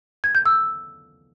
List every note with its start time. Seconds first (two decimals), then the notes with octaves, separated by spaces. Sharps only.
0.24 G#6
0.35 G6
0.46 E6